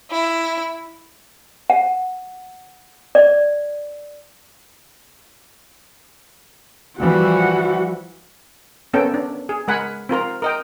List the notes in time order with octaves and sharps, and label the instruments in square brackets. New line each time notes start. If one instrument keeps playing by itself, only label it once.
[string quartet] E4
[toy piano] F#5
D5
[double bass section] E3 F3 G3 [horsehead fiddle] F#4
[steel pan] A#3 B3 C#4 A4 G5
D4
G#4
G#3 A#4 F#5 G#5 B5
C4 F4 A#4 A#5
A#4 D#5 G5